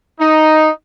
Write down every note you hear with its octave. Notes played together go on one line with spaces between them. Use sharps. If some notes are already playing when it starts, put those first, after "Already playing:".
D#4